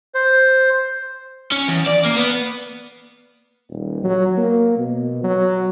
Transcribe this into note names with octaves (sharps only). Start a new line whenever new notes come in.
C5
C#4
E2
D5
A#3
B3
D#1
F#3
A#3
B2
F#3